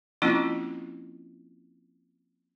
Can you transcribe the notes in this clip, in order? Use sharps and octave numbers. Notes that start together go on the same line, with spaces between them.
F3 A#3 C4 C#4 E4 F4